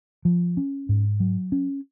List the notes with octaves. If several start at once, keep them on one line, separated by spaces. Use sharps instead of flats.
F3
C#4
G#2
F#3
C#4